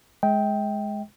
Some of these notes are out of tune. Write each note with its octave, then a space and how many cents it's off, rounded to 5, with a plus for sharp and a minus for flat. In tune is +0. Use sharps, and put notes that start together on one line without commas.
G#3 +10 D#5 +45 G5 +0